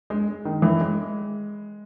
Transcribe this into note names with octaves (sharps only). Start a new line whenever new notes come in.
G#3
D#3
E3
G#3